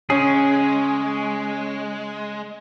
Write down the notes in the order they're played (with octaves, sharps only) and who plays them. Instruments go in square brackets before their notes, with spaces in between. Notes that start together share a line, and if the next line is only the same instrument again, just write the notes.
[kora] C#3 [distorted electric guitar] G#3 [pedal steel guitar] C#4 G#4